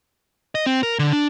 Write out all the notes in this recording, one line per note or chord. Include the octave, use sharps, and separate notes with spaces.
D#5
C4
A#4
D3
D4